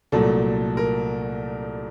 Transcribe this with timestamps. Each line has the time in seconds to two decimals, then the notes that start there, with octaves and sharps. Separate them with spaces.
0.12 C2 A#2 F#3 A3 A4
0.77 A#4